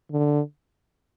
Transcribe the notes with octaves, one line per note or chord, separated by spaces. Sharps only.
D3